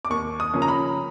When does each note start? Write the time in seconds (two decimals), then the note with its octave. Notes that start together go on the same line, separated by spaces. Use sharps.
0.05 D6
0.10 D#2 C#6
0.40 D#6
0.53 C#3 F3 A#3 C#4
0.62 A#5
0.68 B5